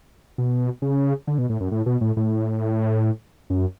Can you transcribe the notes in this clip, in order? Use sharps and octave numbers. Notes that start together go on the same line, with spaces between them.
B2
C#3
D3
B2
A2
F#2
A2
B2
A2
A2
F#2